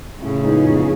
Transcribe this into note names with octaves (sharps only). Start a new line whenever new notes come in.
A2 C#3
F3 G#3 B3 D#4
A1